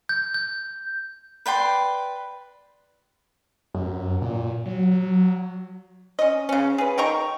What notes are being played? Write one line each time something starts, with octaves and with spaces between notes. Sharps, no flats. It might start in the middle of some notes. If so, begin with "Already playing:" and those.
G6
G6
B4 D5 G5 C6
F#2
A#2
F#3
F#3
C#4 D#5
C#3 C#4
G#4 B4
D#3 G5 A#5 C#6